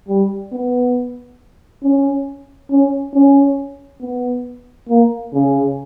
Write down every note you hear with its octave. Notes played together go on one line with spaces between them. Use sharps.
G3
B3
C#4
C#4
C#4
B3
A#3
C#3